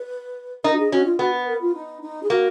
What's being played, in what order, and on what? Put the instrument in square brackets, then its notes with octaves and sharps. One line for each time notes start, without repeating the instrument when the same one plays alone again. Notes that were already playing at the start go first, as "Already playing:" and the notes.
Already playing: [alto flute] B4
[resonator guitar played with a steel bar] D#4 [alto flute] A#4
[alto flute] F#4
G#4
[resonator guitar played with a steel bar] C#4 [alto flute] F#4
[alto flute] F4
[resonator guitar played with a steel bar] B3 [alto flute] F#4
[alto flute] B4
A#4
F4
D#4
D#4
G#4
[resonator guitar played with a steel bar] A#3 [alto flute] F#4